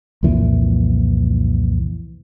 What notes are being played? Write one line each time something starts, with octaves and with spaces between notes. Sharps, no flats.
C2 F2 A#2 E3